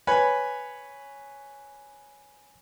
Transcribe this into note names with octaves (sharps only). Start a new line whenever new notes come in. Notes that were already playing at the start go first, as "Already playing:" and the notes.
B4 C#5 G#5 B5